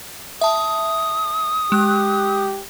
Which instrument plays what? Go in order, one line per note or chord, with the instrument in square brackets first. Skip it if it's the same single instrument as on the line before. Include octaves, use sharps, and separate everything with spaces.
[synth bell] E5 A5 [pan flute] D#6
[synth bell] G#3 F#6 [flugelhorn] G4